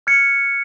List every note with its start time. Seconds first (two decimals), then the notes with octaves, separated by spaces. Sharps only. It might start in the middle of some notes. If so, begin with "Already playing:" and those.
0.07 F6 G#6 C#7